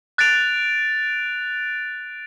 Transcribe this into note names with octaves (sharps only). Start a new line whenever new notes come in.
F#6 A6 D7 F7